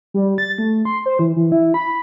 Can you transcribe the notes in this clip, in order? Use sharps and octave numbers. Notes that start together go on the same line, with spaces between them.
G3
A6
A3
C6
C5
E3
E3
E4
B5